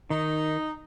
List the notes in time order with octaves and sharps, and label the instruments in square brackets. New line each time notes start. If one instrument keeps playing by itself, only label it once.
[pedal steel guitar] D#3 [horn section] D#4